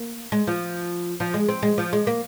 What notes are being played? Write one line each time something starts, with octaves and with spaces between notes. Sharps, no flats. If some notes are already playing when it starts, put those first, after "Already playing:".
Already playing: A#3
G#3
F3
F3
G#3
C4
G#3
F3
G#3
A#3